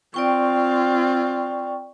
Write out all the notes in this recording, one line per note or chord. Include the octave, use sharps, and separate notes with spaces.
C4 F4 D5 G5 C#6